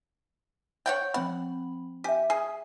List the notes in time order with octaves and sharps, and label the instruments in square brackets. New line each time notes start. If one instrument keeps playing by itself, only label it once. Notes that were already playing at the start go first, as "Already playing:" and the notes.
[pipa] C#5 F#5 G5
[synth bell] F3 C4 B5 [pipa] F#5
[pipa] G4 [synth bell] E5 G#5
[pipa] G#4